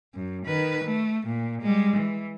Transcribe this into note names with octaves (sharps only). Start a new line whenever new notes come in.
F#2
D#3 B4
A3
A#2
G3 G#3
E3